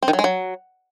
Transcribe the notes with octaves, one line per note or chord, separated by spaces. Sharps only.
C4
D#3
F#3
G#3
F#3